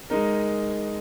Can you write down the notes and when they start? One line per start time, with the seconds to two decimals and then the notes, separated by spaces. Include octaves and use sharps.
0.10 G#3 D#4 A#4